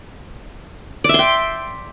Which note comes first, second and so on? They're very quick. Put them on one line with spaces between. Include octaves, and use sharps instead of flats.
D5 E5 C6 G5